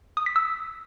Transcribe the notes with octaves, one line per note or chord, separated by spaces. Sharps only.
D#6
B6
E6